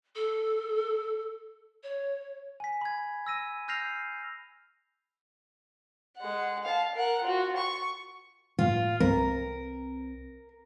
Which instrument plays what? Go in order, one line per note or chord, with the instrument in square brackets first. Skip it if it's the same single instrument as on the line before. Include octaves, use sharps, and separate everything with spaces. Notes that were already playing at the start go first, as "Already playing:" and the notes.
[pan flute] A4
C#5
[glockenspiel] G#5 B6
B5 G#6
E6 A#6 D#7
E6 F6 G6 A#6 C7 F7
[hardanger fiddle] G#3 F#5
F5 A5
A#4 F#5
F4 F#4
C#6
[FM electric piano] A2 [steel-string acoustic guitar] F4
[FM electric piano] C2 C4 [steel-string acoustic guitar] A#4